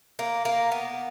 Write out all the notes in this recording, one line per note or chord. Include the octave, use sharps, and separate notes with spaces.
A#3
A#3
B3